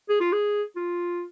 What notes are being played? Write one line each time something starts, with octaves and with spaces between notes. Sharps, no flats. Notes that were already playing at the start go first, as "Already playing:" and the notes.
G#4
F4
G#4
F4